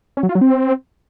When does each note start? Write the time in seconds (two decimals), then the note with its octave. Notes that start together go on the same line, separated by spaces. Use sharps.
0.17 C#4
0.23 F#3
0.29 F4
0.35 F#3
0.41 C4